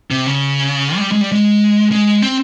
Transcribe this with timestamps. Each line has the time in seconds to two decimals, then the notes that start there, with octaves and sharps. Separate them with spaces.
0.11 C3
0.27 C#3
0.96 G#3
1.01 G3
1.12 G#3
1.21 G3
1.32 G#3
1.92 G#3
2.22 C4